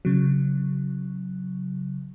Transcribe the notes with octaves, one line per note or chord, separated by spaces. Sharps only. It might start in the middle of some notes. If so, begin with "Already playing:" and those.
C#3 F#3